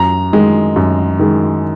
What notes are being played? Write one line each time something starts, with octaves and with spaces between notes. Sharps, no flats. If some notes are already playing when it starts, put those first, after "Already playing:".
Already playing: F#2 A#5
D#3 G#3
F#2
D#3 G#3